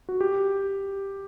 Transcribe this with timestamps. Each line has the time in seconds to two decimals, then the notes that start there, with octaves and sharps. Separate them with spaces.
0.09 F#4
0.21 G4